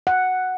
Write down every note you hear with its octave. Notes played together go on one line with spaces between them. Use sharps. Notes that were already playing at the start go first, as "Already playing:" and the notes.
F#5